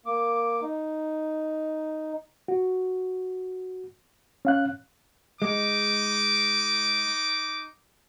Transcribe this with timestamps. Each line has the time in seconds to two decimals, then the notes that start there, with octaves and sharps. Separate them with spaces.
0.06 A#3 D6
0.62 D#4
2.48 F#4
4.45 C#4 F5 F#6
5.42 G#3 D#4 D6